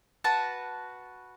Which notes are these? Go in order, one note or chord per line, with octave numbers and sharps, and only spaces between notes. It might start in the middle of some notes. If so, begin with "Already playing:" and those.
F#4 B4 A5